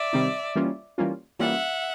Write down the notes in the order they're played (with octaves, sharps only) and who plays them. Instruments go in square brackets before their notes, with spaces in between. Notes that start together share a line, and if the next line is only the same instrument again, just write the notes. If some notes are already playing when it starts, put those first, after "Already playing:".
Already playing: [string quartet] D5 E5
[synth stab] C3 D#3 G3 C4 D#4
E3 G3 A#3 C#4 F4
E3 G3 A#3 C#4 F4
[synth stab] E3 G3 A#3 C#4 F4 [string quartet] E5 F#5